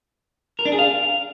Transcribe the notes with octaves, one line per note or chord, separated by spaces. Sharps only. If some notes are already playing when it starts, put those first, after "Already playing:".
A#4
D4
G#4
F5